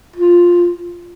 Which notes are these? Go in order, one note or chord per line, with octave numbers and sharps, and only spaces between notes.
F4